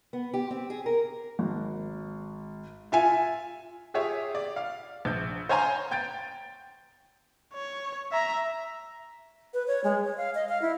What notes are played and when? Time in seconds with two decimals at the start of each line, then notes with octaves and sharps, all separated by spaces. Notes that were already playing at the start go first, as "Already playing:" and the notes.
0.13 B3
0.33 G4
0.51 C4
0.70 G#4
0.86 A#4
1.39 G#1
2.92 F4 E5 G#5
3.94 F4 G4 G#4 C#5 E5
4.35 D5
4.56 F5
5.05 A#1 G6
5.49 C5 C#5 F5 G#5 A#5 C6
5.91 G5 G6 A6 D7
7.54 C#5
8.12 E5 A#5
9.54 B4
9.67 C#5
9.84 G#3
10.04 C#5
10.17 F5
10.35 D#5
10.49 F5
10.62 E4